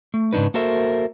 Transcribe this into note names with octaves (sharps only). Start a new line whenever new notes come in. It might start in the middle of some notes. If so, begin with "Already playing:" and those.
A3
G#2 C#3 G#3 D4 D#4 B4
A#3 F#4 A4 A#4 C5 E5